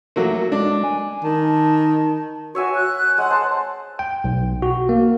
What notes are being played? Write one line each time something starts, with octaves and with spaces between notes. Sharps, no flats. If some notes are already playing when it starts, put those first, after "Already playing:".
F#3 A3 A#3
G#3 D4
G#5
D#3 A5
F#4 C#5 E5 G#5
F#6
G#3 F#5
C5 A5
G5
B1
F#4
A#3